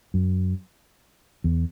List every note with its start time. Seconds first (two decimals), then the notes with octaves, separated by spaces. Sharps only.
0.14 F#2
1.44 E2